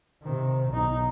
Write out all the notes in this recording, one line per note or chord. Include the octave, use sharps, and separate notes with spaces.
C3 D#3
B1 D#4